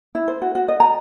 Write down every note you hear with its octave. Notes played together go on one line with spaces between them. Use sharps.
E4
C5
F#4
F#4
D#5
A#5